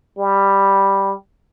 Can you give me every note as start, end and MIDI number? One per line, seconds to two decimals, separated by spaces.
0.18 1.14 55